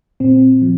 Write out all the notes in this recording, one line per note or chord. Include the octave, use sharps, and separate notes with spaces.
A#2 C4
F3